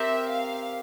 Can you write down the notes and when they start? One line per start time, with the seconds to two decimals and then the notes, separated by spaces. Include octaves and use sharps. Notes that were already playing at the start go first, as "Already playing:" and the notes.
Already playing: C4 G4 A#4 E5
0.30 F5